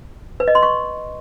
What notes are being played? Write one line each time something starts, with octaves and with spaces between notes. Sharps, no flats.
B4
D#5
C6
C#6